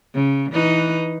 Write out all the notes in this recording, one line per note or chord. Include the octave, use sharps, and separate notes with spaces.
C#3
E3 D#4 B4